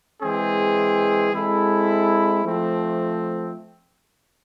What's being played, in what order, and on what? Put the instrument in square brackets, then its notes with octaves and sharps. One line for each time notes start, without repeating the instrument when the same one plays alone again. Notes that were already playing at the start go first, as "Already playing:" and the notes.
[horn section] E3 G#3 C4 G#4
G#3 C4 E4 A4
F3 A3 C4